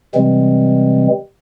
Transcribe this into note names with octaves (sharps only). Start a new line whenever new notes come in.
C3 E3 G3 G#3 C4